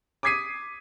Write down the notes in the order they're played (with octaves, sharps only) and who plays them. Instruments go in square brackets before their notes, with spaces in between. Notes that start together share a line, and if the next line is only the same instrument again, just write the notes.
[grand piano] D6 D#6 G#6 B6 C7 D#7